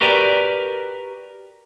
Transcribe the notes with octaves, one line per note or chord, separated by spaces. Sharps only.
F#4 G4 A#4 B4 D5